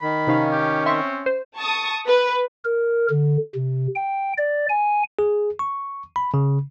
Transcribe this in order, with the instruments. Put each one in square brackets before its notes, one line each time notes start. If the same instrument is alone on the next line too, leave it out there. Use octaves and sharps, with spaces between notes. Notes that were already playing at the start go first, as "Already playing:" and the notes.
[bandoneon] D#3 [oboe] B5
[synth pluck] C3 D#4 F5 [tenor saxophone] C#4
[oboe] G4
[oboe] C4 [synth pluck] E5 C6 C#6
[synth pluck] C5
[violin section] A5 C#6 D#6
B4
[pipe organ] A#4
D3
C3
G5
D5
G#5
[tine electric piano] G#4
C#6
B5
C#3